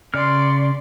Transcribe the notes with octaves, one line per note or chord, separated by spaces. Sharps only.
C#3 D5 C6 F6